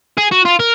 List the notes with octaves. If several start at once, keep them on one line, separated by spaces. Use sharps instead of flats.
G#4
F#4
F4
A#4